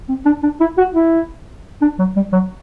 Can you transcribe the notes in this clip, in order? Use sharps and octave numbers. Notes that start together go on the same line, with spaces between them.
C4
D4
D4
E4
F#4
E4
D4
F#3
G3
F#3